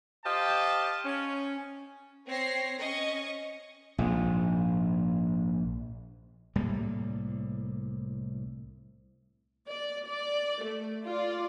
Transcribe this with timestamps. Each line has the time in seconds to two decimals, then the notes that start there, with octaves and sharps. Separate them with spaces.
0.25 G4 C5 D#5 F5 G5 A5
1.05 C#4
2.26 C4 C#5 A#6 C7
2.78 C#4 D#5 C#6
3.98 A#1 G#2
6.56 C2 A2 G3 A#3
9.68 D5
10.05 D5
10.63 A3
11.07 F4 D5